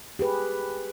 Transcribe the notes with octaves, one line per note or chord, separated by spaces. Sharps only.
G4 G#4 B4